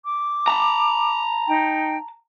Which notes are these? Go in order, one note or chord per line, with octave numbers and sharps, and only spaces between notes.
D6
A5 A#5
D#4 G5